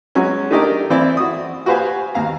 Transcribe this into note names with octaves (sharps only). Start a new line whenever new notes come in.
F#3 G#3 B3 C#4
A3 D4 D#4 G4 A#4 D5
E3 C4 E4 D5
F#4 D#6
F#4 G4 B4 C5 F5 G#5
D#2 B3 F5 A#5